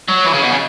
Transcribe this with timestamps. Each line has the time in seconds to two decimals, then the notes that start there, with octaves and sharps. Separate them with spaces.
0.08 F#3
0.25 E3
0.34 C#3
0.42 B2
0.51 C#3